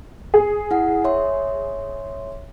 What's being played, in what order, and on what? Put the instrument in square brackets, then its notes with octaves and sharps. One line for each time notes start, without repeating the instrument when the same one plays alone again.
[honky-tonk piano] G#4
[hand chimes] E4 F#5
C#5 E5 C6